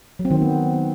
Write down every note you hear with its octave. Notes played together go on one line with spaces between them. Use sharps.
F#3
C4
D#3
C4
B3